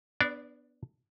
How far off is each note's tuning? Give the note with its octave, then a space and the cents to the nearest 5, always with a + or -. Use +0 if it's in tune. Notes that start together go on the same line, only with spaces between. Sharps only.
B3 +0 D4 +10 D5 -35